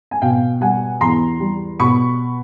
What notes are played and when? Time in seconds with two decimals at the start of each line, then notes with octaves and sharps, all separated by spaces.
0.11 G#5
0.22 B2 F5 G5
0.61 G3 F#5 G#5
1.01 E2 A#5 C6
1.40 G3
1.79 B2 B5 C#6